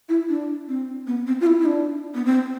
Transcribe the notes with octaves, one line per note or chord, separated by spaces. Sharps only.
E4
D4
C4
B3
C4
F4
E4
E4
D4
B3
C4